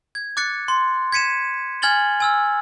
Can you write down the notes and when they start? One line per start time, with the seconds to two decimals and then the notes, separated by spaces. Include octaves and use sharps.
0.15 G#6
0.37 D6 F#6 A6 C#7
0.68 C6
1.12 G#6 B6 C#7 D#7 E7
1.82 G#5 F6 G#6 A6 F#7 G7
2.20 G#5 E6 F6